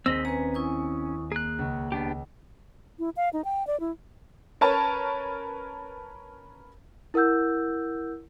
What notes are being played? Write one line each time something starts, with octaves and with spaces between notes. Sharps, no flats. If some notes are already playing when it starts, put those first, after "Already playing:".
D#2 C4 G#4 D#5 E6 B6
C#4 B4 G#5 A#5
E4 C#6 D#6 G#6
A#3 G#4 F6 F#6
C#2 C#6
B3 D4 G4
E4
F5
D#4
G5
D5
E4
C#4 A#4 B4 C#5 A5
E4 A#4 F#5 E6 G6